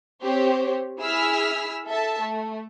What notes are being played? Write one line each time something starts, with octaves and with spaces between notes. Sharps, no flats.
C4 G4 C5 C#5
E4 G#4 E6 F6 B6
A4 E5 A5
A3